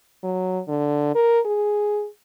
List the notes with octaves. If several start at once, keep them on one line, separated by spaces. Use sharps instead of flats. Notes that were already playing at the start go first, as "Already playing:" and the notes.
F#3
D3
A#4
G#4